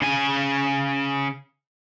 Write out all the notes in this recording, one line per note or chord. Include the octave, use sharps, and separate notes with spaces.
C#3 G#5